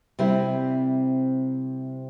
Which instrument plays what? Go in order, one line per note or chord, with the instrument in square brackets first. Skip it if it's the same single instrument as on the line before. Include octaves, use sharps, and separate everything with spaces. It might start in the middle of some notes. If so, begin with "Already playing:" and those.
[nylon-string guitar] C3 G3 C4 E4